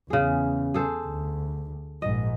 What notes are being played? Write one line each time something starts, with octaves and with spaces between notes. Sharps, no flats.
E2 C#3 G#4
G#4 A4 C5
D2
A#1 G#2 D#5